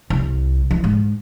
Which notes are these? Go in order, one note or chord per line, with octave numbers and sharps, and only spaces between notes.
C2
E3
G#2